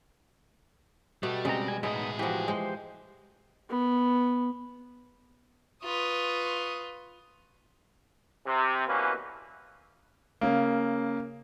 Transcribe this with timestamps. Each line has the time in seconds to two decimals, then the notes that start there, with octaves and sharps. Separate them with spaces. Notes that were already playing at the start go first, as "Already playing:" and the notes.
1.23 B2 G3 A3
1.45 C#3 G#3 C4 A#5
1.68 G#5
1.83 A2 G#3 B3 D#4 G#4 D#5
2.19 E3 F3 F#4 G4
2.48 G#3 G4 C5 C6
3.70 B3
5.84 F4 B4 C#6 D#6
8.46 C3
8.87 C2 B2 E3 A#3 C#4 B4
10.41 C#3 A#3